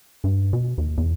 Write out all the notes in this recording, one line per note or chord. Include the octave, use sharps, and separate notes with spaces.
G2
B2
D#2
E2